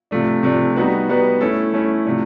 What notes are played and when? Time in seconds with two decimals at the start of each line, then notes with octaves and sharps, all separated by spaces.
0.11 C3 F3 A3 D4
0.43 C3 F3 A3 D4
0.76 G3 B3 D#4 F#4 B4
1.09 G3 B3 D#4 F#4 B4
1.41 A3 C#4 E4 A4
1.74 A3 C#4 E4 A4
2.05 C3 F3 A3 D4